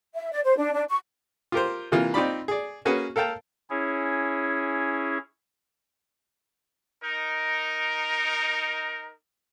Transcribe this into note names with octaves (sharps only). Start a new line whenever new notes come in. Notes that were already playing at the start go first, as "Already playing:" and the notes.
E5
D5
C5
D4
D4
C#6
F4 G4 A#4 C5
C3 E3 A#3 F4
C4 D#4 F4 D5 B5
G#4 D5
A#3 C#4 F#4 G#4 B4
A4 A#4 F5 G5 A5
C#4 E4 G#4 C#5
D#4 A#4